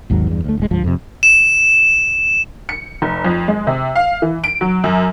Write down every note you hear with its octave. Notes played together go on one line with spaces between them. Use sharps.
G#1 D#2 G#2 F#3
E2 G2
D2 A3
D#1 G#3
D2 G#2 F3
F2 C3
E7
C#7
F1
F2
G#3
C3
F5
E3
D7
F#3
F#2